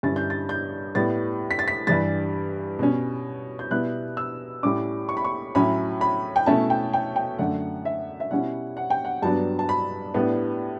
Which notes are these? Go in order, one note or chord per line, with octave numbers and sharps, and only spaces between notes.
G2 D3 G3 C#4 E4 A6
G6
A6
G6
A2 G3 B3 A6
B6
A6
B6
G2 E3 G3 A6
B2 G3 C#4
G6
B2 G3 B3 E4 F#6
E6
A2 G3 C#4 D6
C#6
B5
C#6
A2 F#3 C#4 E4 B5
B5
G5
B2 A3 C#4 E4 A5
G5
G5
G5
F#2 D3 A3 F#5
E5
E5
B2 G3 C#4 E4 F#5
F#5
G5
F#5
G2 F#3 B3 D4 A5
A5
B5
A2 G3 B3 D4